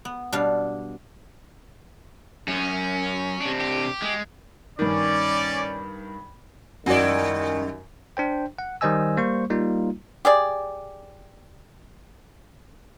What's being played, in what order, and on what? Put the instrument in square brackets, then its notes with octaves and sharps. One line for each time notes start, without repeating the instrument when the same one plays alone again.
[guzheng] B3
B2 G3 D4 F5
[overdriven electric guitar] F#2 [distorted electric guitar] C#4
[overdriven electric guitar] C3 D4
[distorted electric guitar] G4
[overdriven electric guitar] G#3
[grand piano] G2 D#3 [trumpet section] C#4 D5
[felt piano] F#2 [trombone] D#3 [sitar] G3 E4 [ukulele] F#4 D5
[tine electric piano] D4 C5 G5
F#5
D#3 G3 C5 D#5 G#5 E6
G3 A#3 C5 C#6
G3 A#3 D#4 F4
[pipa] G4 G#4 D5